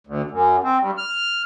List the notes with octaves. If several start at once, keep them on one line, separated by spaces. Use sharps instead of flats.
D2
F#2
C4
G2
F6